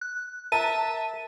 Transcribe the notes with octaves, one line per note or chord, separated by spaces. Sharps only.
F#6
A#4 E5 A5 D#7